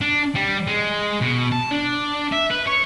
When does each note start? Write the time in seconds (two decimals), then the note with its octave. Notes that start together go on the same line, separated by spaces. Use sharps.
0.01 D4
0.35 G3
0.67 G#3
1.21 B2
1.52 A5
1.71 D4
2.32 E5
2.51 B4
2.67 C#5